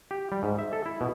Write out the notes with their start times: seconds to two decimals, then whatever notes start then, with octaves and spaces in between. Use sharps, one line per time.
0.11 G4
0.32 G3
0.43 G#2
0.59 E5
0.73 A4
0.86 E4
1.01 B2